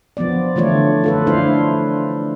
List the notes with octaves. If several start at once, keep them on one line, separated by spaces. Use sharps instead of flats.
F3 B3 D5
D3 E3 A3 F4 C#5 D5
F4 A4 B4
A3 D4 E4 C5 F5